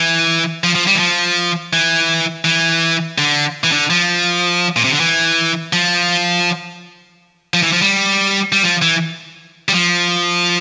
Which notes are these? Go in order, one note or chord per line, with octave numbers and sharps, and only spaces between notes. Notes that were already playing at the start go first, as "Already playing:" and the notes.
Already playing: E3
F3
F3
G3
E3
F3
E3
E3
D3
E3
D3
F3
A#2
C3
D3
E3
F3
F3
E3
F3
G3
G3
F3
E3
G3
F3